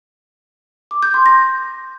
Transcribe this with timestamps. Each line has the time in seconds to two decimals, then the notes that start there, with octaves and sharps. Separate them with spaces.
0.91 D6
1.03 G6
1.14 C6
1.26 A#6